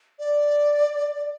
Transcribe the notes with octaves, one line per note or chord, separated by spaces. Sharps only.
D5